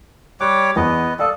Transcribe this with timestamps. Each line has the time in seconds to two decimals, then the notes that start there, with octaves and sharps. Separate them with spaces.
0.41 G3 C#5 D6 F#6
0.76 E2 B3 D#5
1.19 A4 D5 F5 D#6